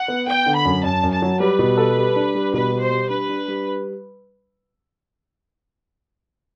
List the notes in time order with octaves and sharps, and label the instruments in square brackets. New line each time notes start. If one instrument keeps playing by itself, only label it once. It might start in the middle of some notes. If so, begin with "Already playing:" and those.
Already playing: [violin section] F#5
[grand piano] B3
[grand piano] B3 [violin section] G5
[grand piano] D3
[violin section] B5
[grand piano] F#2
[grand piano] F#2 [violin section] A5
[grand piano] F#2
[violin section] A5
[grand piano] F#3
[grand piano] G3 [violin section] B4
[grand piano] B2
A4
G3
D4
G3
[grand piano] B2 [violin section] B4
[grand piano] G3
[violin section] C5
[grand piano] G3
[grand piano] D4 [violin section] B4
[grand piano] D4
G3